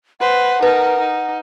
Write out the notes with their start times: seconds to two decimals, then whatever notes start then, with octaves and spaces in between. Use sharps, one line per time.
0.20 B4 C5 F#5
0.63 D#4 A#4 B4
0.99 D#4